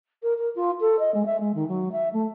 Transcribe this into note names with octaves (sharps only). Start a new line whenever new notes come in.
A#4
A#4
F4
A4
D#5
G#3
E5
G#3
D#3
F#3
E5
A3